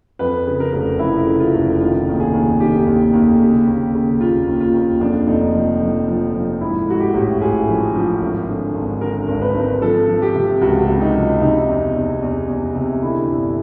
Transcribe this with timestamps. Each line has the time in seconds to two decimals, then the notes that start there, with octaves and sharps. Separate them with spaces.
0.19 F2 B4
0.47 C#3
0.60 A#4
0.73 F1
0.99 F2 E4
1.26 C#3
1.40 F4
1.54 F1
1.80 D#3 F4
2.07 D#2
2.20 G#4
2.33 D#2
2.60 D#3 G4
2.86 D#2
3.13 D#2
3.40 C#3
3.67 D#2
3.94 C#3
4.20 D#2 F4
4.47 D#2
4.60 F4
4.74 D#2
5.00 F2 D4
5.27 F1 D#4
5.54 F3
5.81 F3
6.08 F3
6.34 F3
6.61 G#2 E4
6.88 G#2 F#4
7.00 G4
7.14 A1
7.41 A1 G#4
7.68 F3
7.95 F3
8.21 G#1
8.48 D3
8.75 G#1
9.01 D3 A#4
9.28 G#1
9.42 B4
9.54 G#1
9.81 F3 A4
10.08 F3
10.22 G4
10.35 C3
10.61 C#2 F#4
10.88 C3
11.01 D#4
11.14 F3
11.41 C3 D#4
11.69 E2
11.95 E2
12.22 E2
12.48 E2
12.75 C3
13.02 D3 E4
13.28 G1